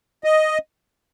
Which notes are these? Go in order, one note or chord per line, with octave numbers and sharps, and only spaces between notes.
D#5